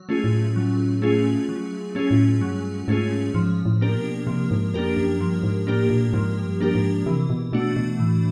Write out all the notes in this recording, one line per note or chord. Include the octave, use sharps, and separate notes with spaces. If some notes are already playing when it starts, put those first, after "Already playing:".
Already playing: F#3
A3 C#4 F4 G#4
A2
F#3
A3 C#4 F4 G#4
F#3
A3 C#4 F4 G#4
A2
G2 F#3
G#2 A3 C#4 F4 G#4
G#2 F3
A2
A#3 D4 G4 A#4
B2
C3 F3
G#2
F2 A#3 D4 G4 A#4
F#2
G2 F3
G#2
A2 A#3 D4 G4 A#4
A#2
A2
G#2 F3
G2
A#3 D4 G4 A#4
G#2
C3 E3
B2
B2 A3 D4 F#4
B2
A2 E3